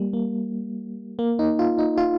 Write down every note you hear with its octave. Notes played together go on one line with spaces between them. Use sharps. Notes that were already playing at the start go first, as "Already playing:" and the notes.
Already playing: G3 A#3
A#3
A#3
D#4
F4
D#4
F4